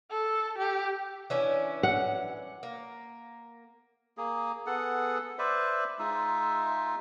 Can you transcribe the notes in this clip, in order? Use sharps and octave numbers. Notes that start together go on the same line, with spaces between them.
A4
G4
E3 C#4 D4
F#5
A#3
A#3 G#4
B3 G#4 A4 F#5
B4 C5 D5 E5
G#3 D#4 F4 E5